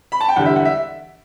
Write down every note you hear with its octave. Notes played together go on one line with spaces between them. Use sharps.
B5
A5
G5
E2 D3 G3 F#5
E5
F#5
E5